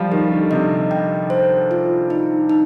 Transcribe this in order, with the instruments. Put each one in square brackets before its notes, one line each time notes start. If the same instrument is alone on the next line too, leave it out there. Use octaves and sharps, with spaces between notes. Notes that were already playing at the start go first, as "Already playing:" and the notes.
Already playing: [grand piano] F3 G3
[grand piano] D#3 [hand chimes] G4
[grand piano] D3
[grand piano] C3 [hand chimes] D#5
[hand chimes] G5
C5
F4
D#4
D#4